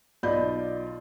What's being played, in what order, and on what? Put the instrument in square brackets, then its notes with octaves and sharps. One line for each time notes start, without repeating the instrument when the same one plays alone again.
[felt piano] B1 F4 D5 D#5 B5 G6